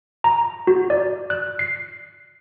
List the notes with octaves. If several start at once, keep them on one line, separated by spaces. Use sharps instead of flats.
A#5
F#4
D5
F#6
C7